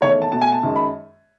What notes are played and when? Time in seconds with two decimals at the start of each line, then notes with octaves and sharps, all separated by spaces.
0.01 E2 D#3 A3 C#5
0.22 A5
0.32 B2 A3 A5
0.41 G#5
0.52 A5
0.63 F#2 D#3 G#3
0.76 B5